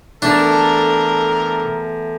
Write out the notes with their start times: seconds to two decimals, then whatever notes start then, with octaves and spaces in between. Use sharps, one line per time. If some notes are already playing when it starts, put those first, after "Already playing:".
0.22 E2 A3 D4 A4 A#4 A5